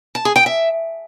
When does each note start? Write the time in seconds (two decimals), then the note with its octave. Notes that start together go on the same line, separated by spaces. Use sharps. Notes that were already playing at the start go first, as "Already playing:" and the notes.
0.15 A5
0.25 G#4
0.36 G5
0.46 E5